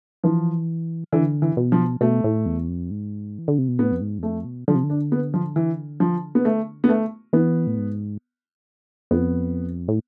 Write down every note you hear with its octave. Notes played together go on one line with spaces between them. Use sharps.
E3 F3
D3 E3
E3
B2
F3
B2 A3
A2
E2
F2
G#2
E3
D3
C3
B2
A2 B3
F2
G#2
E2
F2 A3
B2
D3 F3
C3
D3
D4
B3
F3
E3
F3
B3
A3
B3
A3
E3 B3
A2
G#2
F2 B3
A2